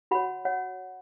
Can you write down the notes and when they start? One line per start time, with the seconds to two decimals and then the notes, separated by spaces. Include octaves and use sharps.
0.11 F#4 C#5 F#5 B5
0.45 C#5 F#5